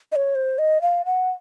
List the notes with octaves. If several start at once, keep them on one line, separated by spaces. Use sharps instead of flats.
D#5
C#5
C5
D#5
F5
F#5